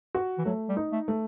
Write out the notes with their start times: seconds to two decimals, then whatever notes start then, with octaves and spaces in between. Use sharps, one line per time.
0.15 F#4
0.38 E3
0.45 F#3 A3
0.69 G3
0.77 D#4
0.92 A3
1.08 A3